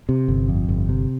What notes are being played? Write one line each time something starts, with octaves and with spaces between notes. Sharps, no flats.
C3
G1
F2
G1
C3